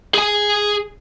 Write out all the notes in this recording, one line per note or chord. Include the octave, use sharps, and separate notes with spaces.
G#4 G#5